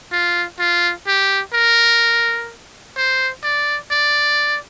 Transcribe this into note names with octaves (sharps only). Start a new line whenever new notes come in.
F4
F4
G4
A#4
C5
D5
D5